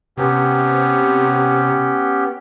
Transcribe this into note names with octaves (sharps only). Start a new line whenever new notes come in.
C3 B3 C#4 G4